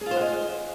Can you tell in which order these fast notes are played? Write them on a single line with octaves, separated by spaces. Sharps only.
G#4 F4 C5 F#5 D#5